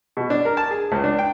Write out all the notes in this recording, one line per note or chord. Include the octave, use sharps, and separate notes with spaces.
B2
D4
A#4
A5
G#4
C#2
D4
G5